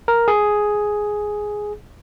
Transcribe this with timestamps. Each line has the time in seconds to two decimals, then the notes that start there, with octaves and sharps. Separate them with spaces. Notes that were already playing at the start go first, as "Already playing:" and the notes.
0.08 A#4
0.28 G#4